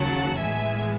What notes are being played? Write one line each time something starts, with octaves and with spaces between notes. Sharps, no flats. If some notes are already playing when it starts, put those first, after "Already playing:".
Already playing: D#2 C#3 F#3 F#5 A5
A2 E3 G#3 B3 E5 G#5